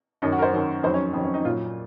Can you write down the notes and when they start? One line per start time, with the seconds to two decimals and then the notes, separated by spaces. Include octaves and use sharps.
0.22 F#2 D#3 F#3 D#4
0.32 F#4
0.39 A#4
0.42 C5
0.53 F#2 D#3 F#3
0.83 F2 D#3 F#3 C5
0.94 C#4
1.13 F2 D#3 F#3 C4
1.24 C#4
1.34 D#4
1.44 A#2 F4
1.48 F#3